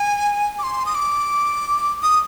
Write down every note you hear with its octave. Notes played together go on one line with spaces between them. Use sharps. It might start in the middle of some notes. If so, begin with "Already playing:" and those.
Already playing: G#5
D6
C6
D#6
D6
D#6